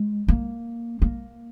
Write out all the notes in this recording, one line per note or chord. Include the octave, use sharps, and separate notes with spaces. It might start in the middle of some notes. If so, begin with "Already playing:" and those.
Already playing: G#3
A#3
A#3